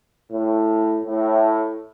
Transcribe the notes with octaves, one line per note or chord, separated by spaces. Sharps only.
A2
A2